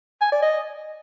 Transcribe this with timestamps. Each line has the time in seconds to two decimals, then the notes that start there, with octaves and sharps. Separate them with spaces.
0.21 G#5
0.32 D5
0.43 D#5